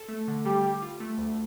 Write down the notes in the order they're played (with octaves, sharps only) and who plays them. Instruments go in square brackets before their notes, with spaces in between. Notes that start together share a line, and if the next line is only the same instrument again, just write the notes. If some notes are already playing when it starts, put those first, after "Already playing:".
Already playing: [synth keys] A4
A3
D3
[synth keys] G3 [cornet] G4
[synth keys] G3
F4
A3
D2